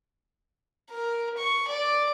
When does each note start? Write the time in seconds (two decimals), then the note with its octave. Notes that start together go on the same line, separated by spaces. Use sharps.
0.90 A#4
1.38 C#6
1.68 D5